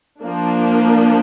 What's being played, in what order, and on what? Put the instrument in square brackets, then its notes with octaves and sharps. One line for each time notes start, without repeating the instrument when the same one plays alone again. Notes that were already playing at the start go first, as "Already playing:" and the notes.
[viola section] F3 A#3 D4